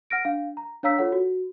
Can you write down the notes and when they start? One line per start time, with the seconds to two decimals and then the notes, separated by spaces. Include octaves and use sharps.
0.10 F#5 F6 A#6 D7
0.25 D4 F5
0.57 A#5
0.83 D4 C#5 F5 A#5 E6 B6
0.98 F4 A4 C#5 F#5
1.12 F#4